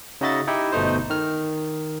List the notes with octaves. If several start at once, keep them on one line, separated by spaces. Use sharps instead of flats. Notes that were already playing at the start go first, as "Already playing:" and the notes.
C#3 D#4 F#4 D#5 E5 A6
D#4 E4 G4
G1 B2 A3 D#4 C5
D#3 F6